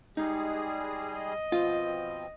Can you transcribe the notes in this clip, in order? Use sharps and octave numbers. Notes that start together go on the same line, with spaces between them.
G3 G#3 D#4 G#4
D#5
B2 F3 C4 F4